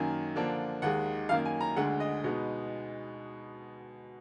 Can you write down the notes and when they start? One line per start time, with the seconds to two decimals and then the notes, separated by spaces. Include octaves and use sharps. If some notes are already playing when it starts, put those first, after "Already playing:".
Already playing: F#2 D#3 A#3 G#5
0.36 D3 F3 A#3 D4
0.82 D#2 D#3 G#3 F#5
1.29 F#2 D#3 A#3 F5
1.45 G#5
1.61 A#5
1.76 D2 D3 G#3 F#5
2.00 D#5
2.24 B2 G#3 B3 D#4